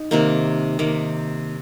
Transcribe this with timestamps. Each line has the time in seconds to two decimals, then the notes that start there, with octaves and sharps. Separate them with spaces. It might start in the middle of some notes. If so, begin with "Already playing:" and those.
Already playing: D#4
0.11 C3 D#3 A#3
0.79 C3 D#3 A#3